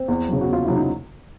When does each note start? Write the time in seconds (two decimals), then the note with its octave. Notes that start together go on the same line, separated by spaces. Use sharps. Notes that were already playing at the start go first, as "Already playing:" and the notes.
Already playing: C4
0.08 E2
0.28 C#3 F#3
0.41 F#4
0.49 E2 F4
0.65 C#3 F#3 E4
0.76 D#4